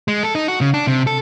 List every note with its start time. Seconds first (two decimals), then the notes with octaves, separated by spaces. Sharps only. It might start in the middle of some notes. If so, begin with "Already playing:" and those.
0.08 G#3
0.23 A4
0.35 D#4
0.48 F#4
0.61 C#3
0.74 D4
0.87 C3
1.07 A4